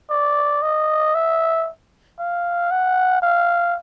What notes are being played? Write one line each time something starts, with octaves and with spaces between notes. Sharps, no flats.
D5
D#5
E5
F5
F#5
F5